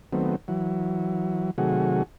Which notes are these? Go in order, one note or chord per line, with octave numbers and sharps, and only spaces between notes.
D#3 F#3 A3 B3 C4
E3 F#3
C3 D#3 F#3 A3 F#4 G#4